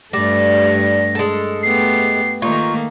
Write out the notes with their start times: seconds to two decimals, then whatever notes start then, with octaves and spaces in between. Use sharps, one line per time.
0.13 G2 G3 A3 A#6
1.15 G#3 A4
1.63 A3 B3 G4 C7
2.42 D#3 A3 A#3 D#4 F4 C#6